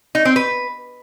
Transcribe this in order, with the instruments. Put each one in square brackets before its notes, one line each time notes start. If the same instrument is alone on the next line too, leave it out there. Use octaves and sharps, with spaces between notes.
[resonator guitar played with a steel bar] D#4
C4
B4